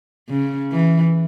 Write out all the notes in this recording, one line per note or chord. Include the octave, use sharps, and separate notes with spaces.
C#3
E3